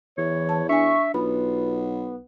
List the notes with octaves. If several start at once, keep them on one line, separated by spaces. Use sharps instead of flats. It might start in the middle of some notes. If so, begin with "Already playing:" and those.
E2 E3 C#5
A5
D4 E5 G#5 C#6
B1 B3 F4 B5